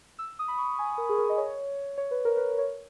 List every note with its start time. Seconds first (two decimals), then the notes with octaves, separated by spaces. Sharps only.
0.19 E6
0.39 D#6
0.48 B5
0.58 C#6
0.79 G#5
0.98 A#4
1.09 G#4
1.18 A#4
1.29 D#5
1.38 C#5
1.98 C#5
2.11 B4
2.25 A#4
2.37 B4
2.59 C#5